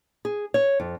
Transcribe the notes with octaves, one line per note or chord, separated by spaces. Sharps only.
G#4
C#5
F2